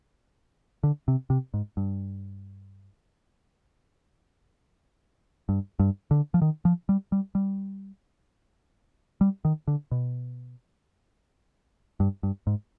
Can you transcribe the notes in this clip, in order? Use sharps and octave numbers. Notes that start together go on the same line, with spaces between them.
D3
C3
C3
G#2
G2
G2
G2
D3
F3
D#3
F3
G3
G3
G3
G3
D#3
D3
B2
G2
G2
G#2